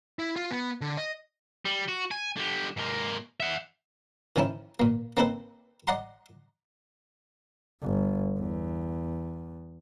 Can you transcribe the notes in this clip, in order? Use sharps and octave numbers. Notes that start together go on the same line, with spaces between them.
E4
F4
B3
D3
D#5
G3
F#4
G#5
D3 G3
G#2 A#3
E5 F#5
D#3 F3 C#4 D#4 E4
A#2 A#3
A#3 C4 D#4 A4 B4 C5
D5 D#5 F#5 A#5 C6
G1
E2